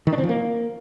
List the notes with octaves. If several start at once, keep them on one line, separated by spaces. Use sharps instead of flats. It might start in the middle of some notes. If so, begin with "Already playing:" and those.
D#3
D4
C4
F3
A#3